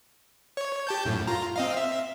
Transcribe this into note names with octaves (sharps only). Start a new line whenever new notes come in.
C#5
G4 A5 G6
F#2 A2
F4 A#5
C4 D#5 F5
E5